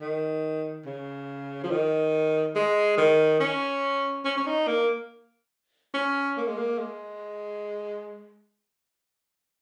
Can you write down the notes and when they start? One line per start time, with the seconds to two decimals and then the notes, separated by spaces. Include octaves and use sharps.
0.01 D#3
0.86 C#3
1.64 F3
1.71 D#3
2.55 G#3
2.98 D#3
3.40 C#4
4.25 C#4
4.37 C#4
4.47 D#4
4.68 A#3
5.94 C#4
6.37 A#3
6.48 G#3
6.58 A#3
6.79 G#3